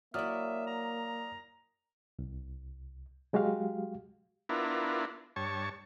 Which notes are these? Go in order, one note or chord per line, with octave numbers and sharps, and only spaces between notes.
F#3 A#3 E4 D5 E5 D#6 F6
A#5
C2
F#3 G#3 F#4 G4 F5
B3 D4 E4 F4 A#4
G2 C#5 A5 C#6